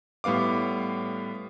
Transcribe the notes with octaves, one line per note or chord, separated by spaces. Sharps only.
A2 G3 B3 F5 D6